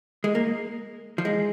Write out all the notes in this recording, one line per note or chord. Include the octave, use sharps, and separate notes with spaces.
G#3
A#3
F3
G#3